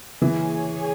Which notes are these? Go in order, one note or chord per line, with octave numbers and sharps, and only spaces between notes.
E3 G#4 C#5 G#5